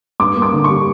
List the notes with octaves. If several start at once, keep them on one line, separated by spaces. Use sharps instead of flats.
G2 D6
A#3
D6
D3
C#6
G3